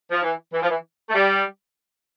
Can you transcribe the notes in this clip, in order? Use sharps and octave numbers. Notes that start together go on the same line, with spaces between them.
F3
E3
E3
F3
E3
A3
G3